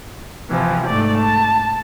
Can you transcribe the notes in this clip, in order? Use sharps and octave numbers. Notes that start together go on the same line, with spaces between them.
C3 E3 F3
G#2 A3 D5
A5